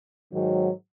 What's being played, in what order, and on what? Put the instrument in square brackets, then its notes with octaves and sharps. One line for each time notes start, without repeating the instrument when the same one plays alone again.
[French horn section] G#2 D#3 F#3